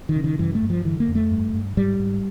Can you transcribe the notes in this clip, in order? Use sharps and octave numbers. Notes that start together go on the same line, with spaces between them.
D#3
C#3
D#3
G2 E3
A3
G2
F3
D3 E3
A#3
F2
A3
G2
G2
G#2 G3
G#2